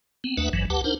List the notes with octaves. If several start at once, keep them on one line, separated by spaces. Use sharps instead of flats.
B3 C4
D#2 A3 D4 B4 E5 F#5
G#1 G2 E3 F#3
D2 G4 B4 F#5 A5
D4 D#4 A#4 C5